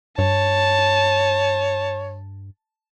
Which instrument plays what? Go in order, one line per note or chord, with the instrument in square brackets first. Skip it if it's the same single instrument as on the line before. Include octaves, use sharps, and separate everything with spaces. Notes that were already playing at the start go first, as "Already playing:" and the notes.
[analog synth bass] G2 [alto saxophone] C#5 [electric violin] A5